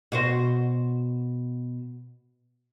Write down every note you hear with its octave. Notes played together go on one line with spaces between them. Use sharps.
B2 F#4 C5